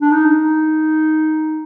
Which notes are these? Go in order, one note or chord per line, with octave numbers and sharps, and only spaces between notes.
D4
D#4